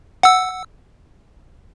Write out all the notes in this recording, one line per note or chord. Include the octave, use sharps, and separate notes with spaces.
F#5 E6